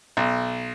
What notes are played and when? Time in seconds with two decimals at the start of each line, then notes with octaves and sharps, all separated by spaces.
0.17 B1